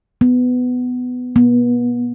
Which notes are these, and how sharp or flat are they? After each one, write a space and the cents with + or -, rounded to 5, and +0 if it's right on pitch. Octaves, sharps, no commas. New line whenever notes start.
B3 +15
B3 -30